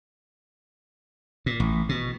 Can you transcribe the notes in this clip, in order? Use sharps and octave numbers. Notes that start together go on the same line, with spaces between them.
A#2
A1
B2